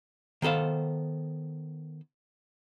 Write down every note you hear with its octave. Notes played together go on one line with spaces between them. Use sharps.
D#3 B3 A4 C5 F5